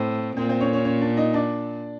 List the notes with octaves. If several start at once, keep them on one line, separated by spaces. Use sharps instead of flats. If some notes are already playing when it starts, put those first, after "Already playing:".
Already playing: A2 C4 C5
A#2 C4 C5
C4 C5
C#4 C#5
C#4 C#5
C#4 C#5
D4 D5
D#4 D#5
D4 D5